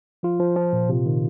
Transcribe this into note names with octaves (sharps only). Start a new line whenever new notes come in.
F3 F4
F3
F3
A#2
C3
D#3